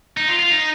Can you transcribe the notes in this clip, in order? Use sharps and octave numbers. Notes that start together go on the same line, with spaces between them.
D#4
F4
F4
D#4